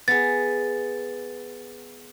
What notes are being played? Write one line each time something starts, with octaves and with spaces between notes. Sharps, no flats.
B3 G#4 A6